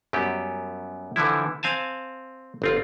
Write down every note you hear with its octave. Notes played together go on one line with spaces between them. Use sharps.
F#2 F#3 G3 B3 G4
D3 E3 F3 E4
C4 F5 G#5 A5
G1 C4 F4